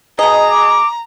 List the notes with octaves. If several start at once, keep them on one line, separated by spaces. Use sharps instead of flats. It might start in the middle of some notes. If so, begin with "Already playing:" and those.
B2 G#4 D#5 A#5
D6